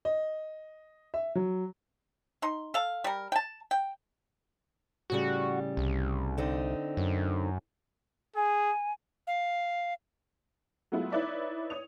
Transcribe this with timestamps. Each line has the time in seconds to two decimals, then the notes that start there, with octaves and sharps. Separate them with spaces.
0.05 D#5
1.14 E5
1.35 F#3
2.42 D#4 C6
2.74 A4 F5
3.04 G3 A#4
3.32 G5 A5
3.71 G5
5.10 A2 C#3 G3 F#4
5.77 C2
6.38 D3 C4 D#4
6.97 F#2
8.36 G#4 G#5
9.27 F5
10.92 F#3 G#3 A3 B3 E4 F4
11.12 D#4 E4 B4 C#5 D5 E5
11.70 C#5 D#6 F7